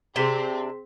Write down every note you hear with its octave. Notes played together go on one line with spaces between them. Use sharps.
C3 C4 D4 G#4 B6 G7